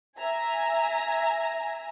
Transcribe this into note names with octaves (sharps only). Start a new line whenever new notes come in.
E5 G#5 A#5